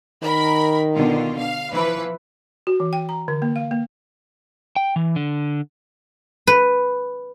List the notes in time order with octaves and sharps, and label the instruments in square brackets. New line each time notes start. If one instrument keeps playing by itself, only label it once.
[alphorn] D#3 [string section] A#4 B5
[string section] B2 D3 F4
F5
E3 F3 B4
[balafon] F#4
E3
G5
A#5
D3
A#3
F5
A#3
[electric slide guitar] G5
E3
D3
[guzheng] B4